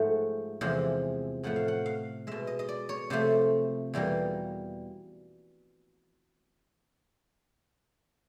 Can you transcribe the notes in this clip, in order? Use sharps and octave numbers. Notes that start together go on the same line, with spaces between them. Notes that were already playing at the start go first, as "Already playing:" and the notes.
Already playing: G#2 F3 A3 F#5
E2 C3 F3 G#3
A2 F3 A3 F#5
F5
F#5
F5
B2 G#3 E5
D#5
D#5
D5
C#5
C3 F3 A3 C5
E2 B2 G3 A#3